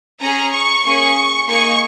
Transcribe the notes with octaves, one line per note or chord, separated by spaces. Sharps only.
C#4 G#4 A#5
C#6
A#3 C#4 G#4 C#6
A#3 D#4 G#4 C#6